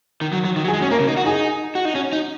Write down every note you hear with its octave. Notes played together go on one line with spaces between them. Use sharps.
D#3
F#3
F#3
D#3
F#3
G#4
G#3
F#4
C#4
A#3 A#4
C#3
D#4
F#4
D#4 G#4
F#4
D#4
C#4 F#4
D#4